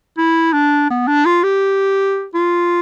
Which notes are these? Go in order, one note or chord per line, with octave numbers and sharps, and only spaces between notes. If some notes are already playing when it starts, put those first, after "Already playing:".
E4
D4
B3
D4
F4
G4
F4